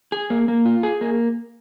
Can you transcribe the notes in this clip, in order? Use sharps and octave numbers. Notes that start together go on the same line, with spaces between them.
G#4
A#3
A#3
F4
G#4
A#3